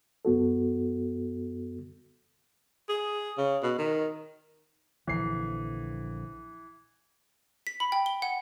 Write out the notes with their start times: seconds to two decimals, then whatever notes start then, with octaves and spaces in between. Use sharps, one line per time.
0.25 F#2 B3 F#4 A4
2.89 G#4
3.38 C#3
3.63 B2
3.78 D#3
5.07 A#1 D3 E3 F3 C7
7.67 B6
7.80 B5
7.92 G5
8.06 G7
8.22 F#5